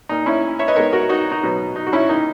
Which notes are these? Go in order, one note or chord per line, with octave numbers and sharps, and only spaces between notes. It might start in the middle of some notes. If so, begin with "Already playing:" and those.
A#2 A#3 D#4
C#4 E4
C#5 E5
B4 D#5
D#3 G#3 B3 A#4 C#5
F#4 A#4
D#4 F#4
D#4
B2 F#3 B3
D#4
F#4
C#4 E4
D#3 A#3 D#4